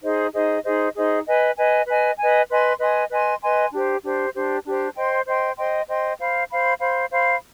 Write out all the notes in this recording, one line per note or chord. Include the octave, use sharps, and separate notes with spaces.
D#4 G#4 C5 D#5
D#4 G#4 C5 D#5
D#4 G#4 C5 D#5
D#4 G#4 C5 D#5
B4 D#5 G#5
B4 D#5 G#5
B4 D#5 G#5
B4 D#5 G#5
B4 D#5 G#5 C6
B4 D#5 G#5 C6
B4 D#5 G#5 C6
B4 D#5 G#5 C6
D4 G4 C5
D4 G4 C5
D4 G4 C5
D4 G4 C5
C5 D#5 G5 C6
C5 D#5 G5 C6
C5 D#5 G5 C6
C5 D#5 G5 C6
C5 F5 B5
C5 F5 B5
C5 F5 B5
C5 F5 B5